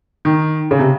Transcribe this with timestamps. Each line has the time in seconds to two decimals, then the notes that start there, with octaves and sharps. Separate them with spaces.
0.25 D#3
0.71 C#3
0.79 C3